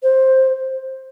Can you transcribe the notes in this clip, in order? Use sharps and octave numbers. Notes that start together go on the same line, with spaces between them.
C5